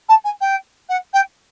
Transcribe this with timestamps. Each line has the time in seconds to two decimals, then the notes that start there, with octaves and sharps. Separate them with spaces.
0.09 A5
0.24 G#5
0.41 G5
0.89 F#5
1.13 G5